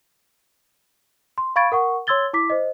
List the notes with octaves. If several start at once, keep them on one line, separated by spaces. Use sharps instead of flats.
C6
F5 B5 C#6 G#6 A6 D7
A#4 F#5 C#6
C#5 C6 E6 G#6 A6 G7
E4 D6 B6
C5 D#5